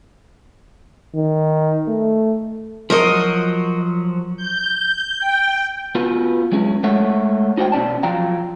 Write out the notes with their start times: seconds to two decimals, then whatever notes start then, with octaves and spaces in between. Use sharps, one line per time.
1.15 D#3
1.87 A3
2.90 F3 F#3 F#4 A#4 C5 D#5
4.37 G6
5.20 G5
5.95 B3 F4 F#4 B4
6.52 F#3 G#3 C#4 G#4
6.83 G#3 A3 A4 C#5 E5 F#5
7.57 D#4 F#4 C5 F#5 G5
7.72 B2 C#4 D5 A5
8.03 F3 F#3 F4 F5 G5 A#5